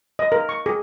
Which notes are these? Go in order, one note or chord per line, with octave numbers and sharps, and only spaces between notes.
D#5
A#4
C#6
G#4